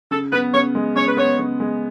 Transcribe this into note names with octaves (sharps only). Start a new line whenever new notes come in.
C#3 A4
B3 B4
C#3 C#5
G#3
C#3 C#5
B4
B3 C#5
C#3
G#3